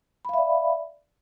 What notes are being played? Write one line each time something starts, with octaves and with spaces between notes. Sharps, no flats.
D5 E5 F5 B5